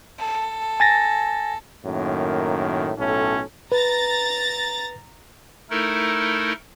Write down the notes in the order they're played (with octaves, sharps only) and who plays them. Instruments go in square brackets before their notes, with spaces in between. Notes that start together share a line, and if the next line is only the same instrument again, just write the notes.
[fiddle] A4
[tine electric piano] G#5 A6 A#6
[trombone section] F#2 A2 D#3 A#3
B1 A2 C#4 A4
[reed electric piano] B4 [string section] A#5 A6 A#6
[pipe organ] A3 D#4 E4 A4 A#4